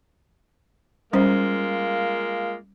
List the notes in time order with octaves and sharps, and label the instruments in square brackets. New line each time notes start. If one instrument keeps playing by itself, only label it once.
[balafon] G3 C#4 C5 [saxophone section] G#3 A#3 F4